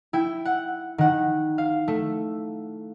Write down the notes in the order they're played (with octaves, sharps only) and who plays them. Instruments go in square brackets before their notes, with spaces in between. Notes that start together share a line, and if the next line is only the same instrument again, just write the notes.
[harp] E4 G5
F#5
D#3 F#5
F5
A3